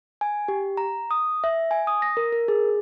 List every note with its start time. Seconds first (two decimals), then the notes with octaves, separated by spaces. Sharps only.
0.21 G#5
0.48 G4
0.77 A#5
1.11 D#6
1.44 E5
1.71 G#5
1.87 D#6
2.02 A#6
2.17 A#4
2.33 A#4
2.48 G#4